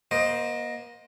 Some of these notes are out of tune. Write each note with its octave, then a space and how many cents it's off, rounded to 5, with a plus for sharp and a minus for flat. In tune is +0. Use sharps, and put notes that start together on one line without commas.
A#3 +40 C5 +0 D#5 +0